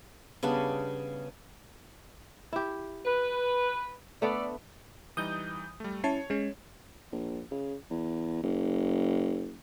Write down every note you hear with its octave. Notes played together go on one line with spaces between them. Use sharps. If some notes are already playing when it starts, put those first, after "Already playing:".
C#3 G3 B3 D4
E4 G4
B4
A3 B3 D4 A4 D5
E3 G3 D#4 D#6 G6
G3 A3
C#4 E4 C#5 A5 C7
G#3 C#4
A#1
C#3
E2
F#1